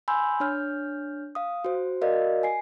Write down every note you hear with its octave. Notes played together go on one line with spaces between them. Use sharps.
G#5 B5 C6 E6 G6
D4 C#5 F6 G6
F5 D#6
F#4 C5
F#4 A#4 D5 D#5 F5
G#5 C7